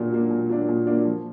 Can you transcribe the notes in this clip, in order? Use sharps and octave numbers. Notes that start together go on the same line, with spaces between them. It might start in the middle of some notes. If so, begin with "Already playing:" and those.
Already playing: A#2 F#3 A#3 D4
F#3 A#3 D4
A#2
F#3 A#3 D4
A#2
F#3 A#3 D4
F3